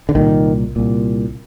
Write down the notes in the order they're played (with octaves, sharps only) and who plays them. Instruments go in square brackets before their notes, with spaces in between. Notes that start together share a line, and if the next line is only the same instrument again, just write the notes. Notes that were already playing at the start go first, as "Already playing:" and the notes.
[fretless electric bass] D3
C2 A#2 D#3
C2 A#2